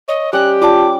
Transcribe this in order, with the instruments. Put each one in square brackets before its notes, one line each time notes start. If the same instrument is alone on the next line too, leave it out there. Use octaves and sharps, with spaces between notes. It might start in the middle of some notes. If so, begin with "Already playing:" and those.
[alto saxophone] C#5 [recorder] D#5
[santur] G3 C#4 G5 [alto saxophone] G4 [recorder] F#6
[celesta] F4 D5 A5 [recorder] D6